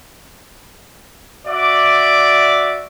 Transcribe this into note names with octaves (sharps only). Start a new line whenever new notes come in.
F#4 D5 E5 D6